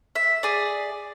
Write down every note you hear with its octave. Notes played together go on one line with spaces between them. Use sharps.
E5
G#4 D5